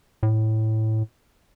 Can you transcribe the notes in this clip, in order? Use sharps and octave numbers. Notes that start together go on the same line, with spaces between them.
A2